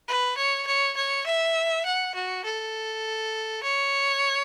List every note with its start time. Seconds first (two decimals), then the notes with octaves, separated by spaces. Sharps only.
0.08 B4
0.38 C#5
0.67 C#5
0.97 C#5
1.27 E5
1.86 F#5
2.15 F#4
2.45 A4
3.63 C#5